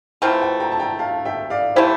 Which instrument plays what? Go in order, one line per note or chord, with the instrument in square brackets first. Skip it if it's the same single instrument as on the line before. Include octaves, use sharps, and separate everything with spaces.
[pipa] E3 A3 C4 F4 [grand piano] G5 A#5
[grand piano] G5 A#5
G5 A#5
A5
G5 A#5
F5 A5
E5 G5
D5 F5
[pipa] E3 A3 E4 G4 [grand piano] C5 E5